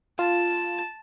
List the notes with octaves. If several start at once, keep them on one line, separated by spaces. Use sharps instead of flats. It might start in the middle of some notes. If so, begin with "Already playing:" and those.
F4 A5